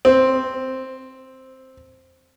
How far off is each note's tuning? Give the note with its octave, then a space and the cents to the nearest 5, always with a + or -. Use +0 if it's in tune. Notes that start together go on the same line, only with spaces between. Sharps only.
C4 +0